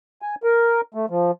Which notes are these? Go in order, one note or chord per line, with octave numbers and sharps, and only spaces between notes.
G#5
A#4
A3
F3